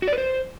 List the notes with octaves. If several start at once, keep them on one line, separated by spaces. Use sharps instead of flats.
F#4
D5
B4
C5